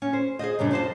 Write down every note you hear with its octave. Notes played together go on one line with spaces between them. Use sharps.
C#4
C5
G#4 A#4 C5 D#5
F#2 C#3 G3 D4
F2 F3 C5 D#5 A5